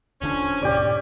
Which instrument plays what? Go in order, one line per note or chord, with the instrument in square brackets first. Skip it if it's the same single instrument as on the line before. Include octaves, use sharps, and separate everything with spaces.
[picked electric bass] D1 D3 D4 [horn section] F3 C#4
[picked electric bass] D#2 G#2 B2 [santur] G4 D5